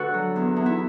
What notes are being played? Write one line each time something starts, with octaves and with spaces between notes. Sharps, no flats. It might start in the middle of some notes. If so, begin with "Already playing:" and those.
Already playing: D2 D3 F#4 A4 B4
F#3
E2
E2
E4